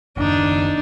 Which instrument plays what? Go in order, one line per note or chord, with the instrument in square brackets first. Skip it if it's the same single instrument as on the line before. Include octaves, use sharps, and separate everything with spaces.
[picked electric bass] F#1 D#2 [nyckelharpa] D4 D#4